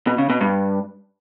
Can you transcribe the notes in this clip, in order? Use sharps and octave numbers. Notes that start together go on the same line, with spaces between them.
B2
C#3
B2
G2